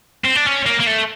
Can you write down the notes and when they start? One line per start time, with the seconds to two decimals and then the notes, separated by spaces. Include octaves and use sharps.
0.25 C4
0.36 D4
0.46 C#4
0.66 A#3
0.80 A#3
0.87 A3